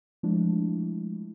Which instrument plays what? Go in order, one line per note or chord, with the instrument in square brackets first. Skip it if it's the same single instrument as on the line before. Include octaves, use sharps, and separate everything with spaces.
[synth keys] F3 G#3 A3 D4 E4